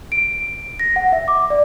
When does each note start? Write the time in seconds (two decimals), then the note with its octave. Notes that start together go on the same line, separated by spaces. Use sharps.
0.12 D7
0.80 A#6
0.96 F#5
1.12 E5
1.28 D6
1.50 D5